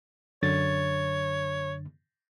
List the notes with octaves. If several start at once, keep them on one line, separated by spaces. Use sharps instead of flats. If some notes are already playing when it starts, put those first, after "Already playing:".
F#2 D3 C#5 A6